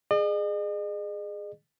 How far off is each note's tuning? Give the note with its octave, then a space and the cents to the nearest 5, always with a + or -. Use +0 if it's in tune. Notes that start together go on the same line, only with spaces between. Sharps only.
G#4 +0 D#5 -45